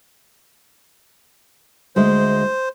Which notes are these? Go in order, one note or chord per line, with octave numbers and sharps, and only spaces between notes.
D2 G#3 C5